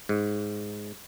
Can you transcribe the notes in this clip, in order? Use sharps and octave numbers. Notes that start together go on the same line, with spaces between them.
G#2